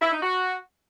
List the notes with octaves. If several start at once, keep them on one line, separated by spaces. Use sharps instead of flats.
E4
D#4
F#4